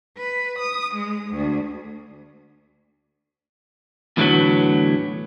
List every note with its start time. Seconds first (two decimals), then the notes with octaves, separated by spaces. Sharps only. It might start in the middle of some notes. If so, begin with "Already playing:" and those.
0.17 B4
0.58 D#6
0.93 G#3
1.29 D2
4.17 E2 A2 D3 D#3 F#3 B3